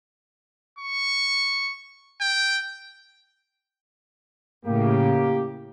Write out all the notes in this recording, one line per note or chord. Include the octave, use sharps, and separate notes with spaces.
C#6
G5
A2 C#3 A#3 G4